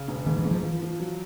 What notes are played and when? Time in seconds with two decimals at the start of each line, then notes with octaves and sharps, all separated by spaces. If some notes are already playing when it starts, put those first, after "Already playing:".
Already playing: C#3
0.08 E1
0.26 G#2 D#3
0.39 E3
0.45 G#2
0.51 F3
0.63 E3 F3
0.82 F3
1.00 F#3